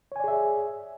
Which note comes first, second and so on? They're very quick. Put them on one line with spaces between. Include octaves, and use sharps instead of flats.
C#5 G#5 D5 G#4 E5